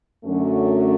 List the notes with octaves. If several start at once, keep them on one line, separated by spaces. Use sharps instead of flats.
F#2 D3 F#3 A3 C#4